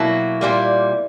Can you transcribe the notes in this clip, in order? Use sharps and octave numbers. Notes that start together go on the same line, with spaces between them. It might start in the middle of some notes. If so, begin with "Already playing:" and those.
Already playing: B2 F#3 A#3 E4
A#2 G3 A#3